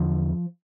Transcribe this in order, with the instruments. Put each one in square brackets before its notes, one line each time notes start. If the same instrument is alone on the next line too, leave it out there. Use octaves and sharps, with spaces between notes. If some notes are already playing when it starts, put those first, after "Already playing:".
Already playing: [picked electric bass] E2 D3 F3